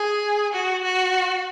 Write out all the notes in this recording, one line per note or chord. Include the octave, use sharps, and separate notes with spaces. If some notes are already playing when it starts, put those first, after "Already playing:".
Already playing: G#4
F#4
F#4